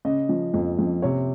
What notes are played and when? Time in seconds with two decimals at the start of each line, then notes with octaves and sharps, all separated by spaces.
0.05 C#3 D#5
0.29 F3
0.54 F2
0.79 F2
1.02 C3 C#5